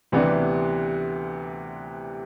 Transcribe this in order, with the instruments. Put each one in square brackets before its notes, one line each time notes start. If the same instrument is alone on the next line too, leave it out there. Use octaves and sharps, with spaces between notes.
[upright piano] D2 C3 E3 B3 D4